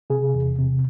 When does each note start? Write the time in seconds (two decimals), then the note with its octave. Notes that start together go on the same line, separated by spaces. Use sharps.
0.10 C3 G#4
0.35 E2
0.58 C3